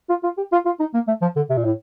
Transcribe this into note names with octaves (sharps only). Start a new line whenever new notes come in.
F4
F4
G4
F4
F4
D#4
A#3
A3
F3
D3
C3
A#2
A2